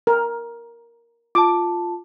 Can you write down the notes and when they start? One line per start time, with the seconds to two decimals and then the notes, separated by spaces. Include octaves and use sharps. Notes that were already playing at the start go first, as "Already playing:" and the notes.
0.07 A#4
1.35 F4 A5 D6